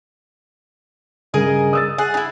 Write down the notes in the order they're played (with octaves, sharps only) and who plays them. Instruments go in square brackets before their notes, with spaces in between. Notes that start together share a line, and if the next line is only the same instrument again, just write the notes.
[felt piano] G2 C#3 [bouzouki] G#4 A#4 D#5
[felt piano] D#6 E6 A6
[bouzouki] G#4 F#5
D#4 E4